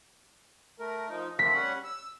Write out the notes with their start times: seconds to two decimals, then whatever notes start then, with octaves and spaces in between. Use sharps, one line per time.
0.80 A3 A#4
1.09 F3 D#4
1.39 A3 A#3 C4 B6
1.53 G3 C#4 F#5
1.84 E6